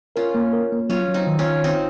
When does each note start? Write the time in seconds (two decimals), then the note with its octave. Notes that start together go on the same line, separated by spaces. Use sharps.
0.16 C#4 F4 A#4
0.35 A#3
0.53 A#4
0.72 A#3
0.89 F#3 C#4 F4
1.08 F#3
1.14 C4 D#4
1.27 D#3
1.39 C#4 F4
1.45 D#3
1.63 G#1 C4 D#4